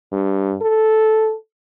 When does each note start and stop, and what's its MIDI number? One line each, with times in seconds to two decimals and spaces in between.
0.12 0.55 43
0.62 1.35 69